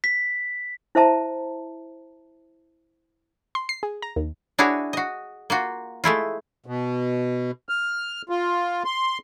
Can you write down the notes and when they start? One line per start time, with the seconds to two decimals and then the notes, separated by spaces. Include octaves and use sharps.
0.04 B6
0.95 E4 C5 E5 A5 A#5
3.55 C6
3.69 C7
3.83 G#4
4.02 A#5
4.16 D#2
4.59 D4 E4 F#4 G#4 C#5
4.93 F#4 D#5
5.50 A#3 F4 F#4
6.04 G#3 A3 E4 F4
6.66 B2
7.69 F6
8.29 F4
8.85 C6